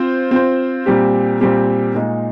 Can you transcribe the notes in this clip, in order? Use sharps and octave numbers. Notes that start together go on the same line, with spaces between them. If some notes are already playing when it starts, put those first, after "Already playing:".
Already playing: C4 F4 C5
C4 F4 C5
A#2 G3 C4 G4
A#2 G3 C4 G4
A#2 G#3 D#4